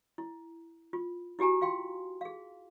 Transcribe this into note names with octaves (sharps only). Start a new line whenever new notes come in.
E4
F4
E4 F#4 G4 G#5 A#5
F4 F5 G5 C6
G#4 F5